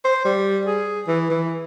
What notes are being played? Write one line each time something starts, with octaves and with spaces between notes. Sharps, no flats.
C5
G3
G#4
E3
E3